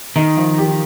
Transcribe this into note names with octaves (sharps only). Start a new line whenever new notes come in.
D#3 D#4
F3
G4